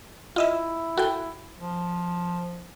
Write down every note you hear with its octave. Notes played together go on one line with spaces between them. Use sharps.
E4 F4 D#5 E5
F#4 A4 G5
F3